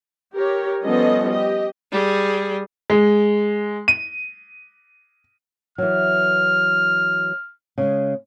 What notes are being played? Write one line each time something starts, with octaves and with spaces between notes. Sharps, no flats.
G4 A#4 C#5
F3 G3 B3 C#4 A4 D#5
G4 D#5
G3 G#4
G#3
D#7
E3 F#3 F6
C#3 G#3